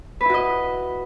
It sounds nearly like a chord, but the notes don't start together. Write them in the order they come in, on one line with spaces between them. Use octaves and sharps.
B4 E4 F#4 D#5